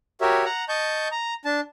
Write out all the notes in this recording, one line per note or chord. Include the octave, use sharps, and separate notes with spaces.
F#4 G4 A#4 C#5 E5
F#5 A#5
D#5 A5 C#6 G6
A#5
D4 A5